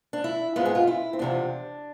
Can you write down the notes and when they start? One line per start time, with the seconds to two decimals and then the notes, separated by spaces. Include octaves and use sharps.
0.13 D4
0.24 E4
0.56 G#2 G#3 B3 F4
0.65 G#4
0.75 F4
0.87 E4
1.13 C4
1.19 E2 C3 F3 D4